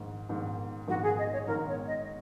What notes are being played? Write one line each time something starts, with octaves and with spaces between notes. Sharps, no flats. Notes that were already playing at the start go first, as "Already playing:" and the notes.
Already playing: A#1 G#2 D#3
A#1 G#2 D#3
A#1 G#2 D#3 F#4
G#4
D#5
C#5
A#1 G#2 D#3 A#4
C#5
D#5